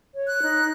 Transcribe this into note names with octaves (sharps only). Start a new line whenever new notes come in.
C#5
F#6
D#4